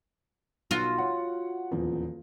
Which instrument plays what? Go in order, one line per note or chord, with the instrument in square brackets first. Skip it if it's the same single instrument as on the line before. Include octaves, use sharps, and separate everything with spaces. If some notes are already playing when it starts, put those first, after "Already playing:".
[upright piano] B1 [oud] F4 F#4
[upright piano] C#5 F#5
D#1 E2 F3